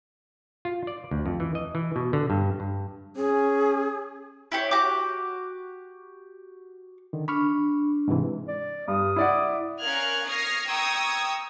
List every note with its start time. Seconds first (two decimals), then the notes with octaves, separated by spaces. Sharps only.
0.65 F4
0.87 D5
1.11 D2
1.26 F2
1.40 E3
1.55 D#5
1.75 E3
1.96 B2
2.13 D3
2.30 G2
2.60 G2
3.16 C#4 G#4
4.52 E4 G4 C#5
4.71 F#4 G4 D6
7.13 D3 D#3
7.28 D4 B5 C#6 F6
8.08 G#2 C3 E3
8.48 D5
8.88 G2 D#6
9.16 E4 D5 F#5
9.80 C#4 A#4 F5 F6 F#6 G#6
10.27 C#6 D#6 F6 G#6 A#6 C7
10.69 G5 A#5 C#6 D#6 E6 G#6